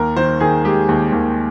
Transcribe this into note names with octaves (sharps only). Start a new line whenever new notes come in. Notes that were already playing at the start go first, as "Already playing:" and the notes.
Already playing: D#2 A#4
D#3 C5
D#3 G#4
G#3 G4
D#2
D#2